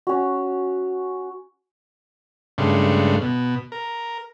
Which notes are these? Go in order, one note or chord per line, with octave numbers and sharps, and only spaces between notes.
C#4 F#4
G2 C#3 G#3 A3 D4
B2
A#4